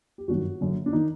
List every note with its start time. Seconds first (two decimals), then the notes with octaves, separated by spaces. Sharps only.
0.18 G4
0.28 G1 F#2 D#3 F#4
0.61 F#1 F#2 D3
0.86 D4
0.93 D#3 D#4